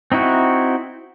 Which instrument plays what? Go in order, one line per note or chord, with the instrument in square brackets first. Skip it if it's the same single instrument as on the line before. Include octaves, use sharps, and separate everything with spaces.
[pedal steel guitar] C4 D#4 E4 F#4